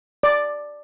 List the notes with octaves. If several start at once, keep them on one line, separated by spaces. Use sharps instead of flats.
D5